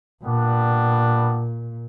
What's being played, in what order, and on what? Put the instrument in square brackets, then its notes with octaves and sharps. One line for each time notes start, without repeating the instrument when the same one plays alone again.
[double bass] A#2 [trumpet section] G3 B3 D4